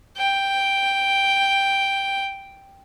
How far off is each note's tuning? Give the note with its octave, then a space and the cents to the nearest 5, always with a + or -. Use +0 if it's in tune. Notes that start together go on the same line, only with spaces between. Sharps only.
G5 +0